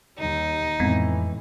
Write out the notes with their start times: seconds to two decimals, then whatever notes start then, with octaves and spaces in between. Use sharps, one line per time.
0.18 D#2 G3 D#4
0.80 F2 A2 E3 G#3 B3 C4